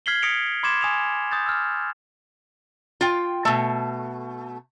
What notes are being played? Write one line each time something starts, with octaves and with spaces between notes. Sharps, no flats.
F6 G#6 B6 C7 F#7 G7
D#6 A#6 B6 C#7 D7 F7
B5 C6 D6 G#6 A6 E7
G#5 D#6 E7 F7
D#6 G6 A6
E6 F6
F4 G5
B2 A3